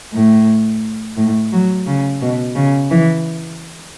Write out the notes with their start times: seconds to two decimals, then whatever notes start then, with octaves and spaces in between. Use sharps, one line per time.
0.14 A2
1.17 A2
1.52 F#3
1.87 C#3
2.21 B2
2.56 C#3
2.91 E3